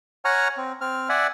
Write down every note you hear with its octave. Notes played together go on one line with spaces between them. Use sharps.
C#5 F#5 G#5 A#5 C#6 F6
C4
C4 F6
D5 E5 F#5 G#5